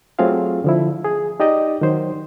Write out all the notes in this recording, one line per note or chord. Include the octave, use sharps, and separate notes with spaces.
F#3 A3 C4 F4 G#4 F5
D3 F3 E4
G#4
D#4 G4 D5 D#5
D#3 F#3 C5